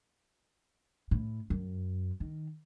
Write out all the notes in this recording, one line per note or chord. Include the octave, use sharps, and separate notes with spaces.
A2
F#2
D#3